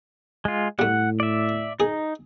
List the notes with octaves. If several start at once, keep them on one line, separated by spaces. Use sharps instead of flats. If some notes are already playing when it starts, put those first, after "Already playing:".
G#3 F4
A2 G3 A3 F#5
D5 E5
D#4 G#4